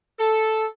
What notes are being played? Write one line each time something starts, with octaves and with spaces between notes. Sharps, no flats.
A4